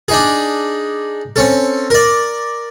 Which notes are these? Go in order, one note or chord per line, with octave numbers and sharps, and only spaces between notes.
D4 D#4 G#4
C4 C#4 A4
A#4 D5